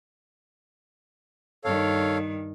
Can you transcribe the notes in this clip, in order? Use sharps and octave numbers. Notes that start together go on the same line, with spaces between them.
G2 D#3 A4 C#5 F5